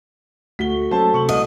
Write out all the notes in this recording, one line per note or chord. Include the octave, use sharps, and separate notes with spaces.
D2 A3 F#4 B6 G7
F#3 A#3 C#4 A4 C5 A5
C3 C#6 F#7
C2 D#5